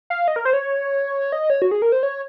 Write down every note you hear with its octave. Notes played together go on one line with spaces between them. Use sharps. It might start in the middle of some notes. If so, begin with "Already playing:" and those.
F5
D#5
A#4
C5
C#5
D#5
C#5
F#4
G#4
A#4
C5
C#5